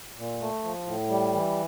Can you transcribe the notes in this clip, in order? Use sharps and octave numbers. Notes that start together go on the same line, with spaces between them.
A#2
A3
F3
A2
G3
E3